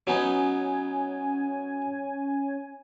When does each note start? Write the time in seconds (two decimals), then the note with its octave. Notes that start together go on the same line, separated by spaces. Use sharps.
0.07 F#3 B3 C#4 D#4 G#5